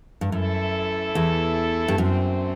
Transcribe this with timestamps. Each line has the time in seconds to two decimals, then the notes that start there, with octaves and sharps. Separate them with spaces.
0.21 G2
0.32 F#2 E3 A3 E4 A4
1.15 E2
1.88 G2
1.98 F#2 D3 A3 C4